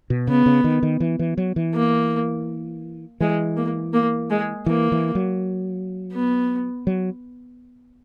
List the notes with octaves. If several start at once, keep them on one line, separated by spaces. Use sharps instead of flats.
B2
C#3 B3
C#3
D#3
D#3
E3
E3
F#3
E3
A#3
E3 G#3
A#3
A#3
G#3
E3 A#3
E3
F#3
B3
F#3